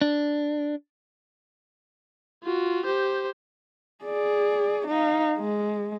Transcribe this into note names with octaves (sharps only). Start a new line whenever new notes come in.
D4
F4 F#4
G4 C5
G#4 D5
D#4 F5
G#3